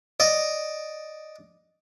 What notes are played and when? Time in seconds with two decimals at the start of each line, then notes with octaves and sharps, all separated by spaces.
0.20 D5 D#5